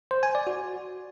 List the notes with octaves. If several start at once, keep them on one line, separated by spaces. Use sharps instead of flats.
C5
G#5
D5
F#4